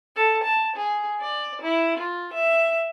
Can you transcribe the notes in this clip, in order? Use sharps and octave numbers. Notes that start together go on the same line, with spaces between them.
A4
A5
G#4
D5
E4
F4
E5